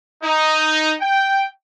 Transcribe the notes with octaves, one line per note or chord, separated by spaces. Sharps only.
D#4
G5